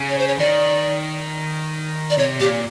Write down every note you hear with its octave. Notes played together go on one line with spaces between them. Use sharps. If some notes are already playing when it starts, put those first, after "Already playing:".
Already playing: C#3
C#5
C5
C#5
D#3 D5
D5
C3 C#5
A#2 G4